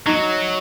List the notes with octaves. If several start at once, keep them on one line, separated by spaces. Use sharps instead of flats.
F#3 D#4